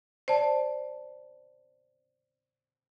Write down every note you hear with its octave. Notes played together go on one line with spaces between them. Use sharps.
C5 D5 A5